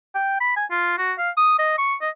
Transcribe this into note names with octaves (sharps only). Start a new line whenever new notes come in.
G5
B5
G#5
F4
F#4
F5
D#6
D#5
C#6
D#5